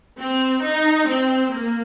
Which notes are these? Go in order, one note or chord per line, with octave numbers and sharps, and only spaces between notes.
C4
D#4
C4
A#3